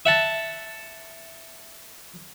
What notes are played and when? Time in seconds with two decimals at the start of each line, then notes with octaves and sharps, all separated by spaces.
0.05 E5 F#5 A5